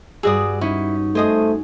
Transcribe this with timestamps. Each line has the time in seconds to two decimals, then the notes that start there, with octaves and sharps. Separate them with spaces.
0.23 G2 F#4 G#4 D5 D#6 E6
0.61 C#4 D#4 E4
1.15 A3 G#4 C5 D#5 D#6